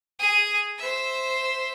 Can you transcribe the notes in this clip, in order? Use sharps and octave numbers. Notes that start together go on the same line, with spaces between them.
G#4 D#6
C5 E5